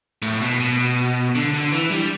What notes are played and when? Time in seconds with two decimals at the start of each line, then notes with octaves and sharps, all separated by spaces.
0.22 A2
0.41 B2
0.60 B2
1.35 D3
1.53 D3
1.72 E3
1.91 G3